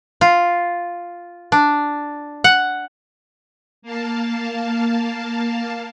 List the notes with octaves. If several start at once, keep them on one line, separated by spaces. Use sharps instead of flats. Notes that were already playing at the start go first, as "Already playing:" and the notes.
F4
D4
F#5
A#3 F5 A5